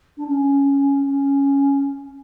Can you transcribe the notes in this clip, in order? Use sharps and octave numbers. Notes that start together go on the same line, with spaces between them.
D4
C#4
C#4